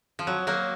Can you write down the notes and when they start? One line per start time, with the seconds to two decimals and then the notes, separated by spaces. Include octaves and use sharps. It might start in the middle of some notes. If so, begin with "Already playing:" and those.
0.19 F3
0.27 F#3
0.47 F#3 A#3